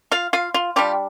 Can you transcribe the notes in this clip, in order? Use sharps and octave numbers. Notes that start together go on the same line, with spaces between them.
F4 F5
F4 F5
F4
G3 D4 F4 G4